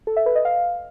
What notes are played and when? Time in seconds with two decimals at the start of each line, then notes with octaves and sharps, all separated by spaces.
0.07 A4
0.17 E5
0.26 B4
0.36 D#5
0.45 F5